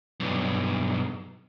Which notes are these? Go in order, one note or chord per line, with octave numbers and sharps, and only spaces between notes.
B1 G2